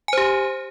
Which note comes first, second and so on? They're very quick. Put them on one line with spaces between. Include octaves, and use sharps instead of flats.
G#5 C5 G4